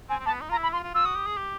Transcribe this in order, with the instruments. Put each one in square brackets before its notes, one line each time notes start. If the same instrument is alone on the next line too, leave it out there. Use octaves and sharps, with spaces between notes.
[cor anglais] C4 [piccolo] G#5
[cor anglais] C4
[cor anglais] A#3 [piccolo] A5
[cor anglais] B3
D#4
[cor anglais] F4 [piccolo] A#5
[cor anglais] E4
[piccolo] B5
[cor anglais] F4 [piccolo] C6
[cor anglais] F4
[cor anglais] F4 [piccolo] E6
[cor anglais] F#4 [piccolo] D#6
[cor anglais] G4
G#4
G4